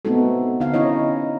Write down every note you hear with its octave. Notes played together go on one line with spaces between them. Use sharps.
A3 B3 C4 D#4 F#4 A4
D3 D#4 F5
C#4 D#4 E4 C#5 D#5